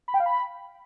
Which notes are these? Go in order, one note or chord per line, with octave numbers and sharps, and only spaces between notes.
B5
G5
F5
B5